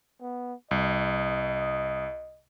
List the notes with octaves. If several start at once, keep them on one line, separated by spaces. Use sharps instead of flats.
B3
C2 D#5